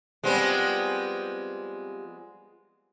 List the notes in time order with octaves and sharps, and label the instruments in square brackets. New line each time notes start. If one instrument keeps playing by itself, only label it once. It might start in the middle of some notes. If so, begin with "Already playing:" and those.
[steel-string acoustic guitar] F3 G3 G4 [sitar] G#3 B3 C4